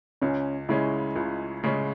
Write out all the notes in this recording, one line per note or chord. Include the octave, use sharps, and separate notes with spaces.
C#2 C#4
C#3 G#3 C#4 E4
C#2
C#3 G#3 C#4